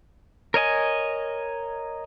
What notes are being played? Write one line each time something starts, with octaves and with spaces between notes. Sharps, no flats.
A#4 C#5 D#5 G#5